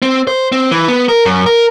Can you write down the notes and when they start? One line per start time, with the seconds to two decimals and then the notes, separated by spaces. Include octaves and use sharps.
0.02 C4
0.27 C5
0.52 C4
0.71 E3
0.88 B3
1.09 A#4
1.26 F#2
1.46 A#4